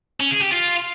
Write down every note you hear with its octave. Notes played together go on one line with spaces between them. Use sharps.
C#4
G#4
G4
F4